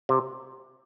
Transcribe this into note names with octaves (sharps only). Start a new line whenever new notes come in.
C3